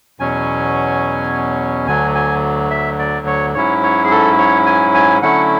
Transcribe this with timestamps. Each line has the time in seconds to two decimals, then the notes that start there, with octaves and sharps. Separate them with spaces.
0.20 E2 B2 F#3 C#4 G#5
1.87 D2 D3 F#3 G#5
2.15 G#5
2.70 E5
2.99 D5
3.27 C#5
3.54 G#2 F#3 C#4 E4 C#5
3.83 C#5
4.04 G#4
4.11 A4
4.38 C#5
4.66 G#5
4.94 G#5
5.22 D3 F#3 A3 C#4 E4 F#5